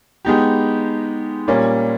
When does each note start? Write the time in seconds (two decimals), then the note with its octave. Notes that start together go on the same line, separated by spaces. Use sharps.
0.25 G#3 B3 D#4 G4
1.48 A#2 G3 A#3 C#4